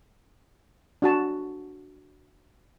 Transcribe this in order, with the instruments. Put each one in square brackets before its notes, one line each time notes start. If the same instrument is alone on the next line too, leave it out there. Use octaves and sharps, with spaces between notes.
[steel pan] D4 F#4 A5